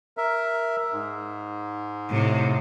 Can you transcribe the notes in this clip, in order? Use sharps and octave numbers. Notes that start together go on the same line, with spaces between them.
A#4 E5
G#2
A2 C3